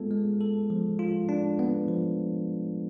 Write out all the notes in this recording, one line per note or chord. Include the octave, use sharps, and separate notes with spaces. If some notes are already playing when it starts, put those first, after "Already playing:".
Already playing: G#3 B3 F4 A4
G#3
A4
F3
F4
D4
B3
F3